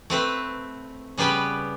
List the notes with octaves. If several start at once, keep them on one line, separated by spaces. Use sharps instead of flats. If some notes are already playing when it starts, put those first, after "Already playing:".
A3 C4 B4
C#3 G3 B3 G4 B4